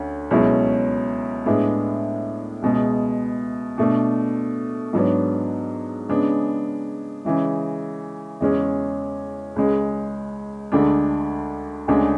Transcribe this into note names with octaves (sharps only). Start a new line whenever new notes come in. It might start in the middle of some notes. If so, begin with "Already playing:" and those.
Already playing: D2 C#4
C#2 B2 F#3 C#4 E4
A2 G#3 B3 D4
C#2 B2 G#3
B2 A3 D4
G#2 F#3 B3 D4
C#3 G#3 B3 D4
C#3 E3 G#3
E2 C#3 G#3 C#4
C#2 C#3 G#3
D2 D3 G#3 D4
D2 C#3 G#3 D4